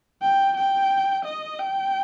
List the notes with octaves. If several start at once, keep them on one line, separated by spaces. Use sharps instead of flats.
G5
G5
D#5
G5